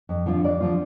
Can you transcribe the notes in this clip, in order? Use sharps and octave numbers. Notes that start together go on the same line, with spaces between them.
F2
D3 F3 C4 F4
F2 D5
D3 F3 C4 F4